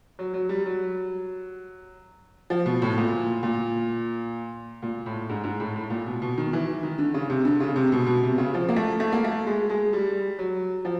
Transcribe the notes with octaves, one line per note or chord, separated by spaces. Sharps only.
F#3
F#3
G3
F#3
F3
B2
A2
A#2
A#2
A#2
A2
G#2
G#2
A2
A2
A#2
B2
B2
D#3
E3
D#3
D3
C#3
C3
D3
C#3
C3
B2
B2
C3
C#3
F3
A#3
A3
A3
A#3
A3
G#3
G#3
G3
F#3
F3